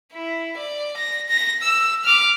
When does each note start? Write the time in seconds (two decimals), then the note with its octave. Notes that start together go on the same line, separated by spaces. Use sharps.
0.13 E4
0.57 D5
0.97 A#6
1.29 A#6
1.63 E6
2.05 D6 F6